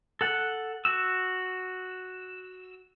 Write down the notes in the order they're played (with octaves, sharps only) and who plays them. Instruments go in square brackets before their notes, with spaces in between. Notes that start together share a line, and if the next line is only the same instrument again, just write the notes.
[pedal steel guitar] A4 F#5
F#4 E6